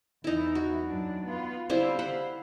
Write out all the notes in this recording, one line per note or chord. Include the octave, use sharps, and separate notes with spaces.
E2 E3 D#4 E4
F#4
F#2 D4
B3 F4
D3 G3 C4 E4 F5
C5 F#5 B5